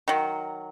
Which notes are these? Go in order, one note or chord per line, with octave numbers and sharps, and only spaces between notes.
D#3 F#3